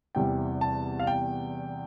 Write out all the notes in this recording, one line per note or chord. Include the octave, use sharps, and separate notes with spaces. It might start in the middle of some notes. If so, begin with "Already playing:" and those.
E2 C3 E3 G3 G5
A5
F5
G5